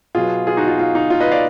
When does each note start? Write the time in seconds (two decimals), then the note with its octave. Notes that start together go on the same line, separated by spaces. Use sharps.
0.15 B2 F#3 B3 F4 G#4
0.47 F4 G#4
0.57 D#4 F#4
0.68 F4
0.79 F4
0.95 D#4
1.10 F4
1.21 B4 D#5
1.31 D5 F5